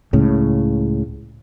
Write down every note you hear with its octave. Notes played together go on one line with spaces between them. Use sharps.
C#2 A2 C#3